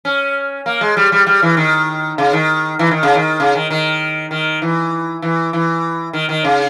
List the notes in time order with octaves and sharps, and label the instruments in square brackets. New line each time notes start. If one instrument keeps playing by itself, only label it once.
[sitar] C#4
A#3
G#3
G3
G3
G3
E3
D#3
C#3
D#3
E3
D#3
C#3
D#3
C#3
D#3
D#3
D#3
E3
E3
E3
D#3
D#3
C#3